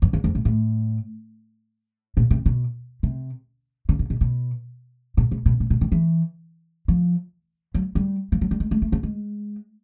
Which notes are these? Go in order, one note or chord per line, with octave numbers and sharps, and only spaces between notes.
F2
E2
F2
A2
A2
A#2
C3
B2
C3
C#3
C3
B2
B2
A#2
B2
B2
A#2
B2
D#3
E3
F3
F#3
G3
F3
F#3
G3
G#3
G#3
A3
A#3
G#3